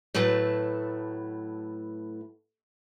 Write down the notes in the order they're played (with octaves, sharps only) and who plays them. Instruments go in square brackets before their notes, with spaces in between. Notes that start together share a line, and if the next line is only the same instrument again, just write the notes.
[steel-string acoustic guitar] A2 F#3 A3 B4 A5